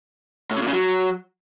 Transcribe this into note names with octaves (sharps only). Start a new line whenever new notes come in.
A2
C#3
A#2
C#3
F#3